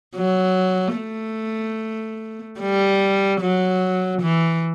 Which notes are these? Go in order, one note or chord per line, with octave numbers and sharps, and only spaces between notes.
F#3
A3
G3
F#3
E3